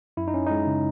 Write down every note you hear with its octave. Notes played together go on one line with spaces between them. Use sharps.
F#2 E4
D#4
C#4
G#3 D#4
C#3